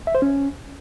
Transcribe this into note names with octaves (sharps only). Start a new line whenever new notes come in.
E5
C5
C#4